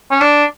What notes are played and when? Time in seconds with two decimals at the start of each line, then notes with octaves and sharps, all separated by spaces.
0.11 C#4
0.21 D4